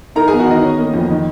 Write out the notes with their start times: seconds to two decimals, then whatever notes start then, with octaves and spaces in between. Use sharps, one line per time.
0.16 D#4 A#4 A#5
0.28 B3 G#4 G#5
0.39 F#4 F#5
0.47 D#3 D#4 D#5
0.63 C#4
0.78 A#3
0.94 F2
1.10 D#3